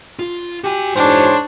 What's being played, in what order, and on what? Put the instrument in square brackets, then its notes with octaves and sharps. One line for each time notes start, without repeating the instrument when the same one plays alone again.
[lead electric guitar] F4
[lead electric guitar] F#4 G#5 [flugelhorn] G4
[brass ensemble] G#2 E3 C#5 [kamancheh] D4 [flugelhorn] C5